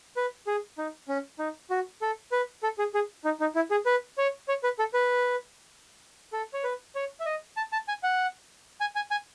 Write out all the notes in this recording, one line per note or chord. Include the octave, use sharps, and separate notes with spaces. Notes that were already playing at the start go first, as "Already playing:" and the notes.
B4
G#4
D#4
C#4
D#4
F#4
A4
B4
A4
G#4
G#4
D#4
D#4
E4
G#4
B4
C#5
C#5
B4
A4
B4
A4
C#5
B4
C#5
E5
D#5
A5
A5
G#5
F#5
G#5
G#5
G#5